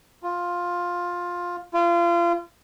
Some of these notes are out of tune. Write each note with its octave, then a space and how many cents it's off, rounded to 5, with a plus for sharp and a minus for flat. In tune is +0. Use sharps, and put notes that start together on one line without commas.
F4 +10
F4 -30